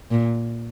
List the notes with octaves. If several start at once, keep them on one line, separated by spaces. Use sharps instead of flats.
A#2